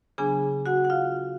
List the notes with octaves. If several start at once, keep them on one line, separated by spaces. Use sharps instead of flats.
C#3 F#3 B3 D4 G#4 G#5
F#4 F#5
F#5
F4 F5